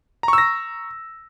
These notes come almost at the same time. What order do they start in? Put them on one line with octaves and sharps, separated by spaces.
A#5 C#6 E6 A#6